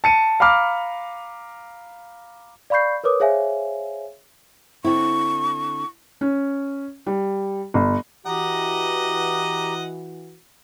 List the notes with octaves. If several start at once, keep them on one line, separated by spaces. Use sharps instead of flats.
A5 C#7 D#7
F5 A#5 B5 D6 F6
D5 F5 B5 C#6 G6 C7
A#4 B4 C#5 D6 D#6
G#4 C5 C#5 E5 F5 G#5
D3 C4 E4 C#6
C#4
G3
G1
E3 F#4 G4 D#5 F#5 A#5